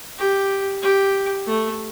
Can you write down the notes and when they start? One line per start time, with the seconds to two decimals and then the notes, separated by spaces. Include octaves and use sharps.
0.18 G4
0.82 G4
1.46 A3